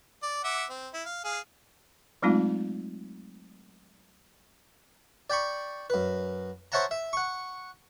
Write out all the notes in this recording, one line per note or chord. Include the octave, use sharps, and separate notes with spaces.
D5
E5 F#5 D6
C4
E4
F5
G#4 F5
F#3 G#3 A3 C4 D#4 F4
D5 G5 B5 C#6
F#2 B4
C5 C#5 E5 F#5 A5 A#5
E5
F#5 C#6